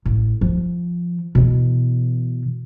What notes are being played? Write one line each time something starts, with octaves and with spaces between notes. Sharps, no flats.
A1
F3
B2 E3